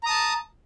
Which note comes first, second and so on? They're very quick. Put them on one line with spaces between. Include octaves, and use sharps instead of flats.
A#5 D#6 A5